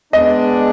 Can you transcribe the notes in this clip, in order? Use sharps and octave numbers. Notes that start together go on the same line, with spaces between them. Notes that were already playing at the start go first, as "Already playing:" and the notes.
G#3 B3 D4 D#5